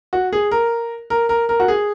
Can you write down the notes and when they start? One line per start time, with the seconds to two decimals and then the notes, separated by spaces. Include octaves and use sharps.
0.13 F#4
0.33 G#4
0.51 A#4
1.10 A#4
1.29 A#4
1.49 A#4
1.60 F#4
1.68 G#4